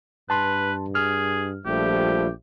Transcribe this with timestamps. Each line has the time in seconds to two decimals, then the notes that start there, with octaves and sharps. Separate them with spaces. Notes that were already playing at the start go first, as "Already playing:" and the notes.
0.30 G2 B4 A5 C6
0.95 G#4 F6
1.66 A#1 F3 G3 A3 G4